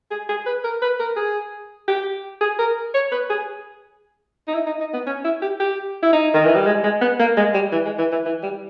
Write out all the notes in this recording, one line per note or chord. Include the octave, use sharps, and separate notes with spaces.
G#4
G#4
B4
A#4
B4
A#4
G#4
G4
G#4
A#4
C#5
B4
G#4
D#4
E4
D#4
D#4
B3
C#4
E4
G4
G4
E4
D#4
D#3
E3
G3
G#3
G#3
B3
A#3
G#3
G3
E3
G#3
E3
E3
E3
G3